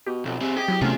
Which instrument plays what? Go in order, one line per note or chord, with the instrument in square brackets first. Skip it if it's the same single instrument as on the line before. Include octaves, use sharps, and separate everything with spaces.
[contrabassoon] B2 [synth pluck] G4
[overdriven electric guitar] B1 [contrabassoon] F2
[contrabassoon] C3 [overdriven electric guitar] C4 G#4
[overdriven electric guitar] G4 [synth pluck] G#4 D#5
[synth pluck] F#3 E4 D#5
[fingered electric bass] C3 A3 [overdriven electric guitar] B3 G#4 [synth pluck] C#4 F4